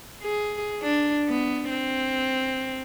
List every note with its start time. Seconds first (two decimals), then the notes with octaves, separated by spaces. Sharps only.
0.23 G#4
0.82 D4
1.29 B3
1.70 C4